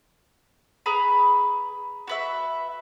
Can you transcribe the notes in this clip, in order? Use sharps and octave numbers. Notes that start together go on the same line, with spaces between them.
G#4 B4 A#5 B5
F#4 B4 E5